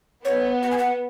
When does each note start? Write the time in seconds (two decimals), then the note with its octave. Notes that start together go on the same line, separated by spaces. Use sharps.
0.25 B3 C#5
0.63 F#5
0.71 G#5
0.78 F#5